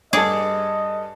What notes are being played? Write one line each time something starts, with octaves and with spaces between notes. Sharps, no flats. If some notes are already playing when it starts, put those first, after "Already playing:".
G2 G#4 A4 D5 D#5